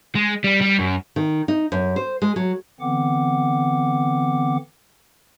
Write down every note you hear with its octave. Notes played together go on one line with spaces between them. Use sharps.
G#3
G3
G3
F#2
D#3
D#4
F#2
C5
G#3
F#3
D3 E3 B3 C4 F#5 D6